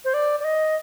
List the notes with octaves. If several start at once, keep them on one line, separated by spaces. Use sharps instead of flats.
C5
D5
D5
D#5